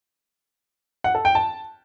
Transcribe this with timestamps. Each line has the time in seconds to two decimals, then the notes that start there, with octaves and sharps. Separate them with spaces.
1.04 F#5
1.15 A4
1.25 G5
1.35 A5